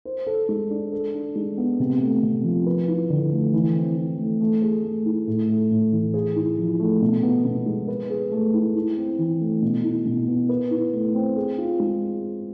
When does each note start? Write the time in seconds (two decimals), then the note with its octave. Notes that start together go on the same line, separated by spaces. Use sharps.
0.05 C5
0.27 A4
0.49 G#3
0.70 D4
0.92 A4
1.14 D4
1.35 G#3
1.58 B3
1.80 C3
2.01 A3
2.23 C3
2.44 F3
2.66 B4
2.88 E4
3.10 D3
3.32 A3
3.54 E3
3.75 C4
3.97 E3
4.18 A3
4.40 A3
4.62 G#4
4.84 A3
5.06 E4
5.27 A2
5.49 A3
5.71 A2
5.93 E3
6.14 G#4
6.36 E4
6.58 F3
6.80 A3
7.01 B2
7.23 B3
7.45 B2
7.66 G#3
7.88 B4
8.10 G#4
8.31 A3
8.54 E4
8.75 E4
8.97 C4
9.19 E3
9.40 A3
9.62 B2
9.84 E4
10.06 B2
10.28 B3
10.49 B4
10.71 E4
10.93 A3
11.15 C4
11.36 G#4
11.58 F4
11.80 G#3